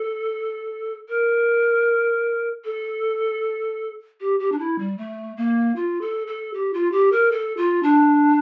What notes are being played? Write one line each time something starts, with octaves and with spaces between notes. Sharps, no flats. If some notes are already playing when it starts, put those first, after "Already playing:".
Already playing: A4
A#4
A4
G4
G4
D4
E4
G3
A3
A#3
F4
A4
A4
G4
F4
G4
A#4
A4
F4
D4